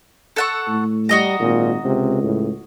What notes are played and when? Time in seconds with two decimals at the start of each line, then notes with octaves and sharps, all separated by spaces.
0.36 A4 F#5 C#6
0.68 A2
1.09 G3 F#4 D#5 A#5
1.40 G#1 A#2
1.85 C#2 C3
2.23 A2